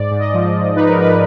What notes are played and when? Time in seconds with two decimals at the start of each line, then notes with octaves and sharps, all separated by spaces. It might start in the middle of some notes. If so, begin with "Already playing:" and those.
Already playing: G#2 D5
0.11 G#2
0.19 D#5
0.33 F3
0.54 F3
0.76 D#4 B4
0.89 A#4
0.97 G#2 B4